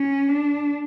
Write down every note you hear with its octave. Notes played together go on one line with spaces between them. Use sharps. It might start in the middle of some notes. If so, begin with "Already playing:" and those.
Already playing: C#4
D4